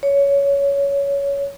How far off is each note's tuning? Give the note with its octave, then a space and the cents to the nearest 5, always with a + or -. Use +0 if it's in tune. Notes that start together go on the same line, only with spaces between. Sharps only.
C#5 +15